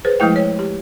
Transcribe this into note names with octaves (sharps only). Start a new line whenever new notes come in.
G#4 B4 C5
F3 G#3 A3 E4 G5
C#5
G4